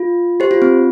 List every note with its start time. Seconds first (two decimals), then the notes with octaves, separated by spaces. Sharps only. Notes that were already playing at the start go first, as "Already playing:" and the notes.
Already playing: F4
0.40 G4 C5
0.51 F4
0.62 C4